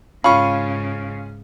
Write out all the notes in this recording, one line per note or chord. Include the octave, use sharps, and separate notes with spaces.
G#2 C#3 C#4 F4 F5 B5 C#6